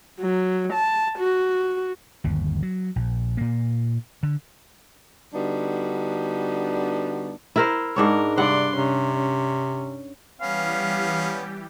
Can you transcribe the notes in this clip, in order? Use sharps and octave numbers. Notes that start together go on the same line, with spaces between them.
F#3
A5
F#4
G1 D#2
F#3
A#1
A#2 A#3
D3
D3 G3 B3 D4 D#4 F#4
E4 A#4 C5
G#2 D4 A#4 C#5
G2 C3 D5 F#5 C6
C3 C#4
C#4
E3 G3 B3 C#4 G4 F5